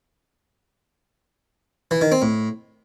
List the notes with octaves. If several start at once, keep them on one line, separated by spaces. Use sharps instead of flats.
E3
D#3
C4
A2